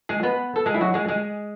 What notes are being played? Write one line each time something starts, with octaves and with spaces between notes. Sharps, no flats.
G#3 G#4
B3 B4
A4
G#3 G#4
E4
F#3 F#4
G#3 G#4
G#3 G#4